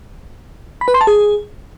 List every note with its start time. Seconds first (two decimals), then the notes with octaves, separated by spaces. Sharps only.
0.81 B5
0.88 B4
0.94 C6
1.01 A5
1.07 G#4